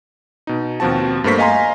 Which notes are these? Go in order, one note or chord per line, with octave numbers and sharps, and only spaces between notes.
B2 D#4
D#2 B2 F3 C4 F#4 A5
G2 A3 A#3 C5 C#6 B6
D#5 F5 G#5 A#5 C6